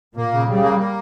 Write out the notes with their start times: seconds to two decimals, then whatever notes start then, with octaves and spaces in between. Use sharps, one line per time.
0.16 A#2 A#3
0.32 C#3
0.48 C#3 G3
0.63 A#3
0.79 A#3